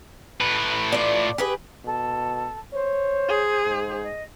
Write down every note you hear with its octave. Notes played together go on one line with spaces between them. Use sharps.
A2 B4
F4 D5
G4 G#4 B4
B2 A4
C5 C#5
G#4
G#2
D#5